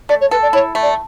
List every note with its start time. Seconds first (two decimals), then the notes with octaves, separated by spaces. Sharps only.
0.09 A3 D5
0.21 C#5
0.31 A4 B4
0.42 D5
0.53 E4 C#5
0.75 A3
0.82 D5